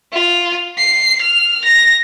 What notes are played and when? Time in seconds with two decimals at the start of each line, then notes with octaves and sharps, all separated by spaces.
0.13 F4
0.78 C7
1.21 F6
1.64 A#6